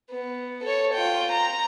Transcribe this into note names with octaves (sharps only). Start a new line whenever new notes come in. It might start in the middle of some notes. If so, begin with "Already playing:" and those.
B3
A4 C#5
F4 G5
A#5